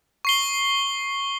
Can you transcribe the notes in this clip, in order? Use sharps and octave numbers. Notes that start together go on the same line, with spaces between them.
C#6 C7 G7